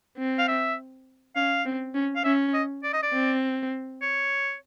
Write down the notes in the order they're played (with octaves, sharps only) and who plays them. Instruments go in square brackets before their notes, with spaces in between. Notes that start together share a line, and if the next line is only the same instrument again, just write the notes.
[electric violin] C4
[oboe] F5
E5
[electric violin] C#4 [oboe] F5
[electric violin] C4
C#4
[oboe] F5
[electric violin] C#4 [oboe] E5
[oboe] D#5
D5
D#5
D5
[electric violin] C4
[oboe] C#5